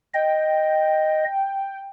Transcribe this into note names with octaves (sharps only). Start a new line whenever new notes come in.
D#5 G5